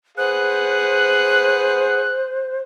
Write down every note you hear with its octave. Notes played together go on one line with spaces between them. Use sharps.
G#4 B4 C5 F#5 F#6